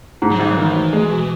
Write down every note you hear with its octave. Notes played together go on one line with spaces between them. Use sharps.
G#2
F#3
G#1 G#3
F#3
D#3 E3
F#3
G#3
B2